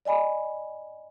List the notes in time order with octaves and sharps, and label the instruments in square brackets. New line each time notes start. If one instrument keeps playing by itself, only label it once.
[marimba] D5 D#5 G#5 B5